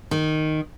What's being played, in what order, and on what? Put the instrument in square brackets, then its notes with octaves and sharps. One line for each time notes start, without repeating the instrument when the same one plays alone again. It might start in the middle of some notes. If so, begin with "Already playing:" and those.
[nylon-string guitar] D#3